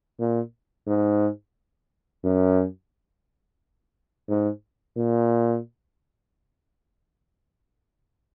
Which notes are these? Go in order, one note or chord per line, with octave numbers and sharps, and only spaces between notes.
A#2
G#2
F#2
G#2
A#2